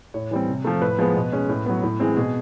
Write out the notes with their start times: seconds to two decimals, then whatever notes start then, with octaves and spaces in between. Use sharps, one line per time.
0.14 A2 C#5
0.31 E3 G3 C4
0.48 C3
0.65 F3 A3
0.82 A2 B4
0.99 F3 G#3 B3
1.16 B2
1.32 G#3 C#4
1.49 A2
1.66 F#3 B3
1.83 A2
2.00 E3 G#3 C4
2.16 B2 G#4